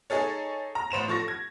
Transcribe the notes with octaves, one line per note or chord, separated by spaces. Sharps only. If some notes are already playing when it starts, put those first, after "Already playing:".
D#4 G#4 A4 C#5
A#5
A1 C5 E7 F7
F3 A4 C#6 A#6
G#6